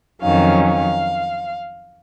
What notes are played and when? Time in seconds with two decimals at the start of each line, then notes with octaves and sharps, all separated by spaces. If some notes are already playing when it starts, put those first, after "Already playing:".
0.21 F2 D#3 F#3 C#4 F5
0.64 F5